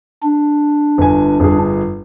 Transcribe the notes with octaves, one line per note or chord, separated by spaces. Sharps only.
D4
G1 G#5
G1 G#4